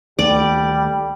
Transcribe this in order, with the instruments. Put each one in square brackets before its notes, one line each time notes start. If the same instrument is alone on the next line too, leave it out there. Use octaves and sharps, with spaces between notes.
[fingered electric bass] D2 D#3 A3 [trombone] G3 [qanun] D5